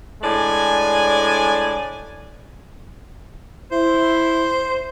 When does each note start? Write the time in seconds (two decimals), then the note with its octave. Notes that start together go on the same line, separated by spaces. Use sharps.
0.22 A2 G#3 D4 D5 G#5
3.72 E4 C5